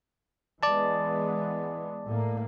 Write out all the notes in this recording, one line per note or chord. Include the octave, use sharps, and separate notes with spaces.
E3 G#3 B3 D5 A5
A2 A#3